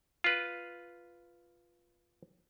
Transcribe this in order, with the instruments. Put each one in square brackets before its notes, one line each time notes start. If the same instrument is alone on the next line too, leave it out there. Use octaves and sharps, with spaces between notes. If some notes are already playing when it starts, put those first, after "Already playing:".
[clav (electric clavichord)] F4 B4